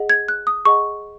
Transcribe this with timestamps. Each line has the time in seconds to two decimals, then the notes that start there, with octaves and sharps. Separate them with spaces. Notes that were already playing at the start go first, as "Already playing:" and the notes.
Already playing: G#4 D#5 F#5
0.10 G#6
0.28 F#6
0.47 D#6
0.65 G#4 D#5 F#5 C#6